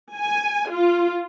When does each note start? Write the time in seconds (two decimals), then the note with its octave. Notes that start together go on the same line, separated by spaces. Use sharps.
0.15 G#5
0.70 F4